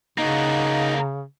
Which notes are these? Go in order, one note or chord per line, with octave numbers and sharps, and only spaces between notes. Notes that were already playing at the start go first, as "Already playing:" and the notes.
C#3 A#3 D#4 F#4